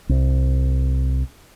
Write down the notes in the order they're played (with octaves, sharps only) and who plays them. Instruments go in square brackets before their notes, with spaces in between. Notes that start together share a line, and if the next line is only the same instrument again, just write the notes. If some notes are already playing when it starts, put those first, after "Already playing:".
[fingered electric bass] C2